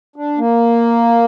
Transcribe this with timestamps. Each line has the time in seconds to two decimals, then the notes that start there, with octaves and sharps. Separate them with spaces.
0.16 D4
0.38 A#3